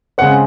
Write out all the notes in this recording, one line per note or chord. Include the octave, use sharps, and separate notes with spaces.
C#3 G#3 C4 F#5